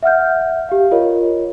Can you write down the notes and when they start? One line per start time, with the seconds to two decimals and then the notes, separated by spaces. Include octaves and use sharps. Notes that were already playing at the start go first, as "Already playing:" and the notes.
0.03 E5 F#5 F6 G6
0.69 G4 F5
0.91 F4 A#4 C#5 D#5